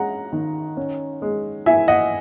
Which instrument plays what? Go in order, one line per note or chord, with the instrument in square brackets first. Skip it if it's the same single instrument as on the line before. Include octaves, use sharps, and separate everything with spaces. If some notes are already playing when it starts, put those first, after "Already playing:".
Already playing: [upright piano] G#3 C#4 F#5 A#5
D#3
C#4
G#3
E4 E5 G#5
D#5 F#5